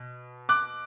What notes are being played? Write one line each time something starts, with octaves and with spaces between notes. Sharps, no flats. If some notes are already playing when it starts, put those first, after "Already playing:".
Already playing: B2
D6 F#6